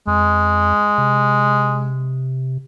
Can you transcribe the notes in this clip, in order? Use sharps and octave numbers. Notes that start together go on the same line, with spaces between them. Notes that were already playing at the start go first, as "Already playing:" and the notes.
F2 G#3
C3